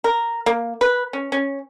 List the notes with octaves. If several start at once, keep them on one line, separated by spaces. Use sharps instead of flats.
A#4
A#3
B4
C#4
C#4